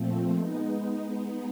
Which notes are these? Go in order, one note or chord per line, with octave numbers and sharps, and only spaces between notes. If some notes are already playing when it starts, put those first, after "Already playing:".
Already playing: A#2 F3 A3 C4
G#3 B3 D#4